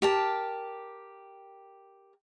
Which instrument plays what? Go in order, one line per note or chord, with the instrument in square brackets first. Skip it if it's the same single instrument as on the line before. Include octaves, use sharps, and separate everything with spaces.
[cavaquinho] G4 A#4 A5